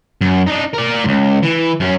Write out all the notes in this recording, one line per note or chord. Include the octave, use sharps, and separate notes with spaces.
F#2
D4 D#4
A#4 D5
C#2 G#2
E3
F#2 C#4